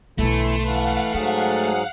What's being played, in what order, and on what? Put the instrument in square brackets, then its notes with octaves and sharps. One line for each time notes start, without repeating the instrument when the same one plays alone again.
[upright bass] B1 D3 [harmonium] E3 E4 A4 [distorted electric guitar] A3 [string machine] C6
[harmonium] E3 A4 B4 [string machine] F5 F#5
[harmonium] G#2 F#3 G#4 [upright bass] D#4